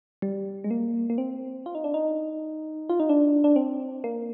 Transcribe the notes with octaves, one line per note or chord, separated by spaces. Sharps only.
G3
G#3
A#3
A#3
C4
F4
D#4
D4
D#4
F4
D#4
D4
D4
C4
A#3